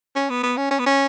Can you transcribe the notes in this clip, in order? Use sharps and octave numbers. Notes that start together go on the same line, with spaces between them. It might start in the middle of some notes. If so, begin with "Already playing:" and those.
C#4
B3
B3
C#4
C#4
B3
C#4